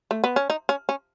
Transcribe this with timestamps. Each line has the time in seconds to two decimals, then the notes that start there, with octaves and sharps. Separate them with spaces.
0.11 A3
0.24 B3
0.36 C#4
0.50 D#4
0.69 C#4
0.89 C#4